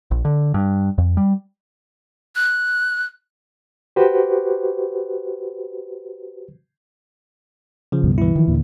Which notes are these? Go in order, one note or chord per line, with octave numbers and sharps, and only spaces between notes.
A#1
D3
G2
F2
G3
F#6
F#4 G4 B4 C5
C#3 F3
C#2 G2 B2
E3 E4
D#3 F3
D#2 A#2 D3